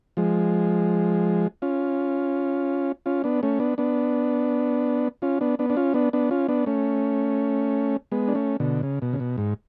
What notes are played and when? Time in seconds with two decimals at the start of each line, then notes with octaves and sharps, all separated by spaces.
0.17 F3 G#3
1.62 C#4 F4
3.06 C#4 F4
3.24 B3 D4
3.43 A3 C#4
3.60 B3 D4
3.78 B3 D4
5.22 C#4 F4
5.41 B3 D4
5.59 B3 D4
5.70 D4
5.77 C#4 F4
5.94 B3 D4
6.13 B3 D4
6.31 C#4 F4
6.48 B3 D4
6.66 A3 C#4
8.12 G#3 B3
8.28 D4
8.35 A3 C#4
8.60 B2 D3
8.83 C#3
9.02 B2
9.13 C#3
9.20 B2
9.38 G#2